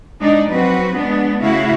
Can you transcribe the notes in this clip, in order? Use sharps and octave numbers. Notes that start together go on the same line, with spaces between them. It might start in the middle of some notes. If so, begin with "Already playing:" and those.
G#3 D4 D#4 D5
F3 F#3 C4 F#4 B4
G#3 B3 D4
C#3 A3 E4 F#4 F5